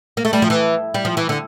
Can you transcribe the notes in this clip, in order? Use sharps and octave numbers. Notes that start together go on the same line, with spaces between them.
A#3
A3
G3
F3
E3
G3
F3
E3
D3